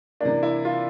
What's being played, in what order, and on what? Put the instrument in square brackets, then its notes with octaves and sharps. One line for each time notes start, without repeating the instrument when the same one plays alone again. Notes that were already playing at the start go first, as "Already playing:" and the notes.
[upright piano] C3 E3 A#3 [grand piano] D4
[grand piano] E4
F4